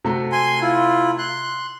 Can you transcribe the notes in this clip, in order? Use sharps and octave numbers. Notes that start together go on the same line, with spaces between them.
C3 A3 F#4
G#5 C6
E4 F4
C6 F#6